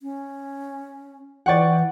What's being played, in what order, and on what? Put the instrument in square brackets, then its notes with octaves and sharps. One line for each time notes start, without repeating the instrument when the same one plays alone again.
[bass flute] C#4
[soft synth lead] E3 [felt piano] D5 G5 [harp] F#5 C#6 A6